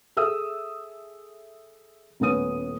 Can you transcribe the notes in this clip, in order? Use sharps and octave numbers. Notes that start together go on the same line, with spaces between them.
G#4 A4 E5 D#6 E6
D#1 A2 B3 C#4 D#6 D#7